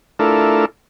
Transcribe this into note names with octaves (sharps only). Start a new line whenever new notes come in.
A3 D4 E4 F4 A4 A#4